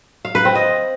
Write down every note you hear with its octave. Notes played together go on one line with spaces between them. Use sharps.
F5
B4
C4
D#5